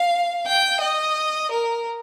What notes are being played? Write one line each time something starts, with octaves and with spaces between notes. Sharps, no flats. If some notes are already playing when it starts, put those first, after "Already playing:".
Already playing: F5
G5
D#5
A#4